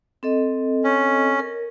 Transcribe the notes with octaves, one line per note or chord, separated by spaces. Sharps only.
C4 A4 D#5
C#4
A#4